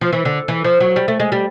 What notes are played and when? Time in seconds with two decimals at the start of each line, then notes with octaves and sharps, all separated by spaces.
0.01 F3
0.13 E3
0.25 D3
0.48 E3
0.64 F3
0.80 F#3
0.96 G3
1.08 A3
1.20 G#3
1.32 G3